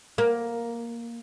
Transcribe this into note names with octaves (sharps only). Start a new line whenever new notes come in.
A#3